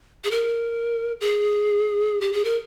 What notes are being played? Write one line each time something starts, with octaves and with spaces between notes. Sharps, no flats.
G#4
A#4
G#4
G4
G#4
A#4